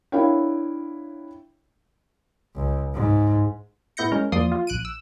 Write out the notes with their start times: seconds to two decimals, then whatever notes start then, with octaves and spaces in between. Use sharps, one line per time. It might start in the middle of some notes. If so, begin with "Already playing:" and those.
0.12 D4 E4 A#4 C#5 F5 G5
2.55 C#2
2.94 G#2
3.97 A2 B3 E4 G6 A#6 C#7
4.12 G#3 C#4 A#4
4.32 E2 F3 A#3 D5 C6 D#6
4.52 F4
4.67 A#1 F#6 D7 D#7
4.85 E6